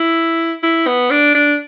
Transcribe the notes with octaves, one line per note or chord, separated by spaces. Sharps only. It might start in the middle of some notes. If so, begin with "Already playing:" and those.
Already playing: E4
E4
B3
D4
D4